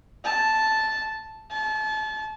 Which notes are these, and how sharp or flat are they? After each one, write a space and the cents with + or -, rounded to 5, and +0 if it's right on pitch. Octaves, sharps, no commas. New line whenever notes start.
A5 -5
A5 -30